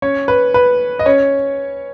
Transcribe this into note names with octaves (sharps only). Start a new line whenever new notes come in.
C#4 C#5
B4
B4
D#5
C#4 C#5